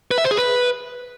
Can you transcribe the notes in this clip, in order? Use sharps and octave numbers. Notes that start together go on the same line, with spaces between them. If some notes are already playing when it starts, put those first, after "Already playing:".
B4
E5
C5
G#4
B4